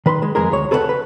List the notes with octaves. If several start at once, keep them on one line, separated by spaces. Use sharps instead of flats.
D#3 B4 B5 C6
G#3
F2 G#3 G#4 A#4
D2 C#5
G#4 A4 B4 C#5 E5 F#5
B4